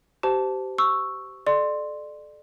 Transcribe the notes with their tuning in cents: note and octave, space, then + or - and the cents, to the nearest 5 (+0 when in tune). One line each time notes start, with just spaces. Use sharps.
G4 -25 C5 -25 A5 +0
C#6 +0 E6 +0
A4 -25 D5 +30 C6 +5